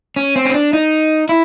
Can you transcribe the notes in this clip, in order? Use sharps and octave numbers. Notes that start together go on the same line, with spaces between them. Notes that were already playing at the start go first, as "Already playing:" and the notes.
C#4
C4
C#4
D4
D#4
E4